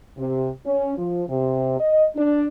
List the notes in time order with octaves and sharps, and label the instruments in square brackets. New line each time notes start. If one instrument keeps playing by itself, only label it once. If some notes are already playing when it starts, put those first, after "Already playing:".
[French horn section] C3
C#4
F3
C3
D#5
D4